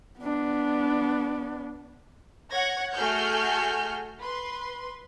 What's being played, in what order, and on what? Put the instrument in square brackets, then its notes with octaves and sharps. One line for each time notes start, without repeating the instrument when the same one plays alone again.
[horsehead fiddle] B3 D4
[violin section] C#5 F#5 G#6 A#6
A3 F#4 G#4 A4 F6 G6
B4 C6